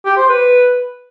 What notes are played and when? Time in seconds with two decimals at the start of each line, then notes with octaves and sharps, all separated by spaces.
0.05 G4
0.17 C5
0.29 B4